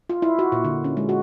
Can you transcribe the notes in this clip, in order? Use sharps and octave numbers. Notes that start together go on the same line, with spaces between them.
F4
E4
F#4
A#2
D3
C#4
G#3
F#4